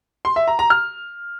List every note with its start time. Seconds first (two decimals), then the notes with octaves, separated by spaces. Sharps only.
0.25 C6
0.36 E5
0.48 A#5
0.59 A#5
0.70 F6